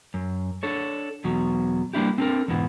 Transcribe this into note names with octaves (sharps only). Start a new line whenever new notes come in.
F#2
D4 A4 C#5
E2 B2 F#3
G3 A#3 D4 E4 G4
C4 D4 G4 A4 A#4
E2 G#2 B2 E3 B3